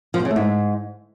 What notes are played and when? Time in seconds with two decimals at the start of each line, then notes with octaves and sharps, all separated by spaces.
0.14 F3
0.20 B2
0.25 C#3
0.31 A3
0.36 G#2